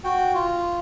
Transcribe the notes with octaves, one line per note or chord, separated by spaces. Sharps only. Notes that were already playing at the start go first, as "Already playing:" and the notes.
F#4 G5
F4